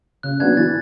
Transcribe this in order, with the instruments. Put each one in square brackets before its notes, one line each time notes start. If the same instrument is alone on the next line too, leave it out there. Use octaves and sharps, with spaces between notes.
[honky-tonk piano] C#3 [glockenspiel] F#6
[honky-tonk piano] F#3 B3 D4 [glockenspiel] G#6
[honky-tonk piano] E3 [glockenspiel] A6